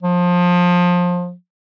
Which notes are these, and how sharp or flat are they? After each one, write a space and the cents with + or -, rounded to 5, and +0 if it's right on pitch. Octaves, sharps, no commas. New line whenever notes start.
F3 +25